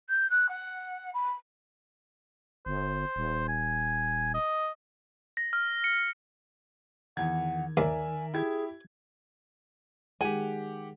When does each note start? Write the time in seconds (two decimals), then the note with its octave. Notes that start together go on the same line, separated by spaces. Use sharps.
0.09 G6
0.30 F#6
0.49 F#5
1.14 B5
2.66 G1 C5
3.16 D#1
3.48 G#5
4.34 D#5
5.37 A#6
5.53 F6
5.84 C#7
7.17 E2 D#3 F#5 G#6
7.77 D#2 A#4 D5 E5 G#5
8.34 E4 G4 G#4 G#6
10.21 D#3 G#3 G4 G#4 F#5 G#5